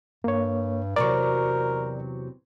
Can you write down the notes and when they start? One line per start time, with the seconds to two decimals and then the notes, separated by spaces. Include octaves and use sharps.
0.24 G2 A#3 C#5
0.96 E2 C3 F#3 A#4 D5 C#6